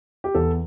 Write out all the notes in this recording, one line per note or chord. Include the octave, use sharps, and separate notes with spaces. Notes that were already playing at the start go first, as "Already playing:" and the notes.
G4
E2 A4